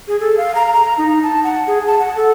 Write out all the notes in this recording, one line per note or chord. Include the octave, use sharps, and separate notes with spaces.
G#4
A4
F5
A#5
A#5
D#4
A5
F#5
G#4
A5
F#5
A4